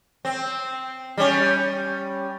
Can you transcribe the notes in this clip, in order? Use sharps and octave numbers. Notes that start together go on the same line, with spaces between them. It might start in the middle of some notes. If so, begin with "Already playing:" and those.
C4
G3 C#4